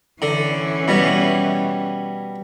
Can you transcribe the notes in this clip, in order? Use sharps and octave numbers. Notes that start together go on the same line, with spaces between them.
D3 E3 C#4
B2 G3